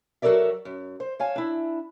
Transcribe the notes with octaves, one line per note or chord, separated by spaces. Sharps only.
F#3 F#4 A4 A#4 D5 E5
F#2
C5
C#5 F5 G#5 A5
D4 E4